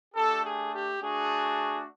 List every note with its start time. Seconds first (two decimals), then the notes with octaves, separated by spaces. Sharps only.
0.15 A3 D4 G4 A4
0.44 G#4
0.72 G4
1.01 A3 D4 F#4 G#4